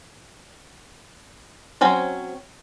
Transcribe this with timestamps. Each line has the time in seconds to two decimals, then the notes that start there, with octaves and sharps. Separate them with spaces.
1.81 F#3 C4 C#4 C5